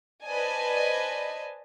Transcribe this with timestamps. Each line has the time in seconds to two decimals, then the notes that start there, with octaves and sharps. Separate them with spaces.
0.25 B4 C5 D5 D#5 G#5 A5